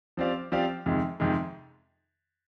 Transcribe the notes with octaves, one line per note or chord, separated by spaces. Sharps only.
F3 C4 G4 D5 F5
F3 C4 G4 D5 F5
F2 C3 D#3 G#3
F2 C3 D#3 G#3